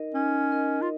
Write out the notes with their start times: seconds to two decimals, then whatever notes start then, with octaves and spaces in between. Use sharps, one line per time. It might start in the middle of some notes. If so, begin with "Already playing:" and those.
Already playing: D#4 A#4 D#5
0.15 C#4 D#4
0.52 A#4 D#5
0.82 F4